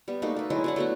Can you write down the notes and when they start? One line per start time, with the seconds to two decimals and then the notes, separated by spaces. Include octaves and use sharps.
0.08 G3 B3
0.22 A3 A#3 D#4 F#4
0.36 A4 B4
0.50 F#3 G#3 E4 D#5
0.64 F#3 D4 F#5
0.76 A3 B3 F#4